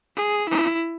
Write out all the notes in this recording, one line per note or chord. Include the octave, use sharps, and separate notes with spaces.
G#4
E4